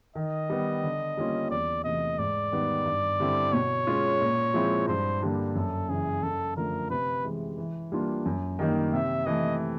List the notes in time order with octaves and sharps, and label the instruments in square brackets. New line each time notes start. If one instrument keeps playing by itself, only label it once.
[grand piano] D#3 [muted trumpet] D#5
[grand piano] G3 B3
D3
G3 A#3 C#4 F4
[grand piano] E2 [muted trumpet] D5
[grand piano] C3 E3 A3 [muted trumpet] D#5
[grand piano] G#2 [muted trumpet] D5
[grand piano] D#3 G3 B3 D#4
G2
D3 G3 C4 E4
[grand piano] B2 [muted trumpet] C#5
[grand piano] G#3 C#4 F4
A#2
F3 G#3 C4 E4
[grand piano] G2 [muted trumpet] C5
[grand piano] D3 G3 A#3 D4
[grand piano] F#2 [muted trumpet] A4
[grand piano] C#3 E3 [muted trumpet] G#4
[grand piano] F#2 [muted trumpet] A4
[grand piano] D3 F3 A3 [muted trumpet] A#4
[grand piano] C3 [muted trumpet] B4
[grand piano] E3 G#3
E3
G3 A#3 D4 F4
F#2
D#3 G3 A#3 D#4
[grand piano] C3 [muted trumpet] E5
[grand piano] E3 A3 [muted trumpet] D#5